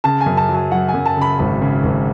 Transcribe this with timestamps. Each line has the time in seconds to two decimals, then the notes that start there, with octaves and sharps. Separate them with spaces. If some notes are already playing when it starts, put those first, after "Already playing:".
0.04 C#3 A5
0.21 G#5
0.26 F#2
0.37 A5
0.49 F#3
0.55 G#5
0.71 F#3 F#5
0.88 G#5
0.94 F#2
1.06 A5
1.17 C#3 B5
1.39 G#1 B5
1.62 C#3
1.83 G#1